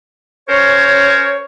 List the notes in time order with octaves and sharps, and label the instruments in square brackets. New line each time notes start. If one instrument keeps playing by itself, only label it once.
[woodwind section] C#4 A#4 C5 C#5